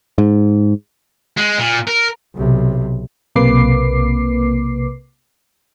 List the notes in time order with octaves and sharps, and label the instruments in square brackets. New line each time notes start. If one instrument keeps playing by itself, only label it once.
[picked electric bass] G#2
[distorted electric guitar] G#3
A#2
A#4
[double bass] B1 C3
[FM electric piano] B1 C3 A#3 B4 D6 C7